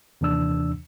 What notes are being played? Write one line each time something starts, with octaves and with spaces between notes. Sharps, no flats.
D#2 C3 E3 D4 E6